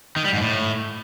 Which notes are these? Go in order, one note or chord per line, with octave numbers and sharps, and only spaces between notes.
D#3
G3
G#2
A2